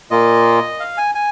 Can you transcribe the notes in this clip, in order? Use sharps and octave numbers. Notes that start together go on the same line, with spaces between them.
A#2 A#3 F4 D#5
F5
G#5
G#5